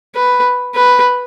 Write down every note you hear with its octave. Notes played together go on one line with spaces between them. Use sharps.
B4
B4